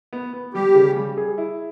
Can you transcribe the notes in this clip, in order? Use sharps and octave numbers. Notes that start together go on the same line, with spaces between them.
B3
B3
G3 G4
C#3
G3
G#4
E4